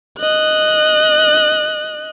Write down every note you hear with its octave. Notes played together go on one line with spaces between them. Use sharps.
D#5 F#6